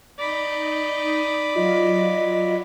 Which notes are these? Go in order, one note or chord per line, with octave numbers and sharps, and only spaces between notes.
D#4 D5 D#5 B5
F#3 F4 D#5